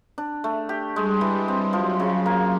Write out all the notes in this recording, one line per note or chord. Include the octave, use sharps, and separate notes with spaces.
D4
A3
G4
G3 G#3
E3
C4
F3 F#3
C#3
A#3